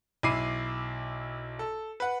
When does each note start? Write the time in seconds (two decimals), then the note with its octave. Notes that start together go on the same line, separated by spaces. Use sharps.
0.23 B1 E4 B5 D6 C7 D#7
1.59 A4
2.00 B4 F#5